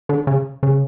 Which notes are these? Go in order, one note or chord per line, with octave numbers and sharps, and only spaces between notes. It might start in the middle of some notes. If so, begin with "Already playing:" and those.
D3
C#3
C#3